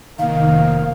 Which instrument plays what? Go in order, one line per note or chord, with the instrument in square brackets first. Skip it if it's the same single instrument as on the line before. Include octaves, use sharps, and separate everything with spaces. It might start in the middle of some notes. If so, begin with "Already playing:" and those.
[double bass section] F1 A#3 [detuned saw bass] D#3 [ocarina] F5